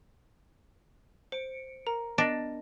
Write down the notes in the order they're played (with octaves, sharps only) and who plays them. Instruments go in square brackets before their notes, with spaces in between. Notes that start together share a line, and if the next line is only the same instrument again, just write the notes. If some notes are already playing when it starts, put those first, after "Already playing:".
[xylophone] C5 [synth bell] C#7 D7
[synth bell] A#4 [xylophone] A#5
[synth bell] B3 A#4 [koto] D4 [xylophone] D#5 A#6